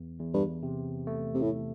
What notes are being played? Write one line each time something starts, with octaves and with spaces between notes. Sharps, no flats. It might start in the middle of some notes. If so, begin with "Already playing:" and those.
Already playing: E2
E2
G2
C3
A3
C3
A2